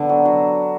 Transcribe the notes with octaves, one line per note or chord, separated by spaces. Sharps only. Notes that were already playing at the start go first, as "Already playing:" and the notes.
Already playing: D3 B3 D4
F#3
F#3